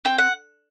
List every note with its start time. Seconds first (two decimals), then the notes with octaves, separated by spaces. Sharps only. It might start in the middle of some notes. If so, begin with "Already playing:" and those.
0.05 C4 G5
0.18 F#5